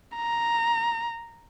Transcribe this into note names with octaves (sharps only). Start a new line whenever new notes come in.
A#5